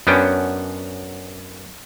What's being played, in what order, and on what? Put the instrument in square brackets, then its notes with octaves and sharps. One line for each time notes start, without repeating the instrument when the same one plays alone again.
[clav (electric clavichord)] F#2 B3 C#4 D4 G5